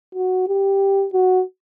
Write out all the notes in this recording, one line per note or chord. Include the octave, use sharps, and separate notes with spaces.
F#4
G4
F#4